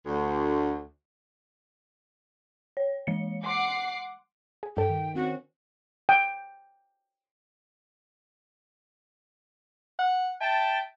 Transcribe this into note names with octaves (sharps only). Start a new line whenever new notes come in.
D2
C#5
E3 G#3 C#7
F#5 C6 D6 C7
G#4
G2 A4 G5
D#3
C4 C#4 F#4
G5
F#5
E5 G5 A5